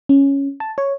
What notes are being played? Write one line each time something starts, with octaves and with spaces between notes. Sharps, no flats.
C#4
A5
C#5